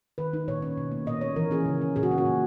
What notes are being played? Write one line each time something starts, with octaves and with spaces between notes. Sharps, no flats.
D#3 B4
D#4
A#2 C#5
C#4
B2
A#3
A#2 D#5
C#4 C#5
E3 A#4
C#4 G#4
C#3
C#4
A#2 G#4
F#4
C#4
F#4
A#2